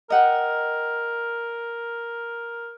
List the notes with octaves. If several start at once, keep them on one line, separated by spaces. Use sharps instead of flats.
A#4 D#5 F#5 G5